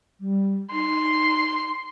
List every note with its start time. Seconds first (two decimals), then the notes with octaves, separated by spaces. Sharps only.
0.20 G3
0.72 D#4 C6